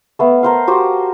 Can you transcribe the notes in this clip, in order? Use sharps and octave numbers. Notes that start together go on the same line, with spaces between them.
A3 B3 F5
A#4 C5 F5
F#4 G4 C5